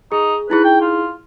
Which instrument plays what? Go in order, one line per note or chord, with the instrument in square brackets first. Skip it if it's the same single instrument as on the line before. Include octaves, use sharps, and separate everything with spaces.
[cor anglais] D#4 [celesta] G#4
[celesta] D#4 E4 G#4 [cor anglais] B4
[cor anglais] G5
F4